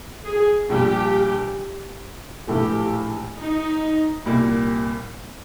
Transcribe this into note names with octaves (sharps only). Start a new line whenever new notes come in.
G#4
A#1 A#2 G3 G4
A#1 A2 E3 A3 G4
D#4
C2 A#2 G3 A#3